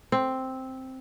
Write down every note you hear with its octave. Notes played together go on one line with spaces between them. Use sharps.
C4